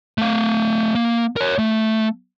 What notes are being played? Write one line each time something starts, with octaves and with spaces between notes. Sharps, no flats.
A3 F5
A#3
A#4 C#5
A3